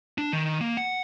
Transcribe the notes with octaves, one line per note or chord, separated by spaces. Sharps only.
D4
D#3
A#3
F#5